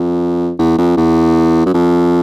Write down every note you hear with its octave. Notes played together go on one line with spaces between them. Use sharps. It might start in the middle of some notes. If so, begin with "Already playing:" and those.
Already playing: F2
E2
F2
E2
F#2
F2